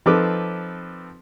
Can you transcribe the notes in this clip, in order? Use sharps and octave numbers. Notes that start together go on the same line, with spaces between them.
F3 C4 D#4 A4 B4 D6